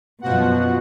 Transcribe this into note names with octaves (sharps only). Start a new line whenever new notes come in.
F#2 B2 F3 F#4 F#5